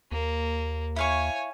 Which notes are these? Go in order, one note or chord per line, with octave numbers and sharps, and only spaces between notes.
D#2 A#3
E4 C#5 F5 G#5 C#6